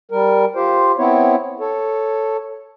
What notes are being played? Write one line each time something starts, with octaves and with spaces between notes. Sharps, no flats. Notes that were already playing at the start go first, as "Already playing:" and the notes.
G3 A#4
F4 G4 C5
B3 C4 E4 C#5
A4 C#5